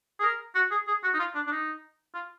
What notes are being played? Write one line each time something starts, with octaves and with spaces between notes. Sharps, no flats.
G#4
A#4
F#4
G#4
G#4
F#4
D#4
F4
D4
D4
D#4
F4